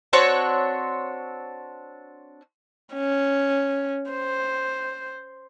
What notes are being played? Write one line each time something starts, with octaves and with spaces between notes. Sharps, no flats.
C4 D4 F#4 C#5
C#4
C5